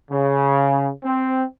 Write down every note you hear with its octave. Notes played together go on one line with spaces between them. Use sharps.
C#3
C4